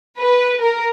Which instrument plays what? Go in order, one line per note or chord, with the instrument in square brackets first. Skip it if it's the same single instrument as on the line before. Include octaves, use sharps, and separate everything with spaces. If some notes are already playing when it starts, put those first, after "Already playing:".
[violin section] B4
A#4